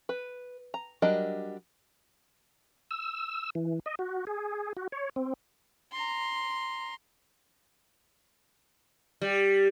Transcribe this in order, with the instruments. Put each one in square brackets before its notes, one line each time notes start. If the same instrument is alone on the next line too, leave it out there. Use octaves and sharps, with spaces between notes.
[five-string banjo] B4
A#5
F#3 G3 D4 A#4 D#5
[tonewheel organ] E6
E3
D#5
F#4
G#4
F#4
C#5
C4
[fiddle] A#5 C6
[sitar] G3